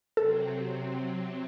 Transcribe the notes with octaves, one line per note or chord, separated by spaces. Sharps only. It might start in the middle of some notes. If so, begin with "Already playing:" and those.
C3 F#3 C4 A4